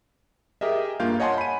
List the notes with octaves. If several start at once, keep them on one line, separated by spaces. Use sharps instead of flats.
G4 G#4 A#4 D#5 E5
G2 A#3 F4 F5 G6
C#5 D#5 F#5 G#5 A5 C6
B5 D#7